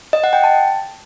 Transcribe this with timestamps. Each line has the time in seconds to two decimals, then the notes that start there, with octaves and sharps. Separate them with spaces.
0.13 D#5
0.24 F#5
0.33 G5
0.44 A5